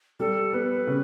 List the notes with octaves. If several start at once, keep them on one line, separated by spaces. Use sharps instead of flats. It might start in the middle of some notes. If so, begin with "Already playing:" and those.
G3 A4
B3 B4
C#3